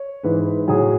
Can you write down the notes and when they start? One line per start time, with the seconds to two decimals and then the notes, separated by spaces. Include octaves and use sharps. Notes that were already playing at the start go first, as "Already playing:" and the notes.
Already playing: C#5
0.23 G#2 E3 B4
0.68 A2 F#3 G#4